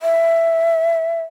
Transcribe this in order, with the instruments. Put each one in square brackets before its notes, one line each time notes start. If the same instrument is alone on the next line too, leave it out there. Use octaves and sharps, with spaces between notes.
[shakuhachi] E5